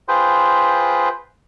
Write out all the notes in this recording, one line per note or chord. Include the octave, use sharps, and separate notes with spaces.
F4 G#4 B4 C5 G5